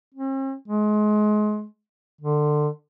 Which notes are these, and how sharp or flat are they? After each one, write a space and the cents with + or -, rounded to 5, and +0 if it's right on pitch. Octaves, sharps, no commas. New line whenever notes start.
C4 +45
G#3 +30
D3 +25